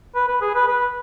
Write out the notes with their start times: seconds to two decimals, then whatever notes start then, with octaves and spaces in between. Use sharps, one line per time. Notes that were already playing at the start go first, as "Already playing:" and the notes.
0.15 B4
0.28 B4
0.41 G#4
0.55 B4
0.68 B4